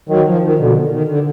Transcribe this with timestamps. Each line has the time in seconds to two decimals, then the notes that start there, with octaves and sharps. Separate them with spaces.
0.09 D#3 F#3
0.26 F3
0.43 D#3
0.59 B2 D3
0.91 D#3
1.08 D3